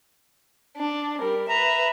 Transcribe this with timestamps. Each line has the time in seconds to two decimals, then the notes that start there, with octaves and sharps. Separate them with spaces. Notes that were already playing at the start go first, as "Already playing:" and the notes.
0.77 D4
1.19 G3 A#4
1.49 B4 E5 A#5